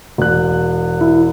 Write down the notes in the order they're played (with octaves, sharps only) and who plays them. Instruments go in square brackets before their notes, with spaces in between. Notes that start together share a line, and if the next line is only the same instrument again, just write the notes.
[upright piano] E1 F#6
[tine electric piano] E4